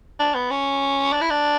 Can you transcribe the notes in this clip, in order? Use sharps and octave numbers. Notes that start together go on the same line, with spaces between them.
D4
B3
C#4
D4
E4
D4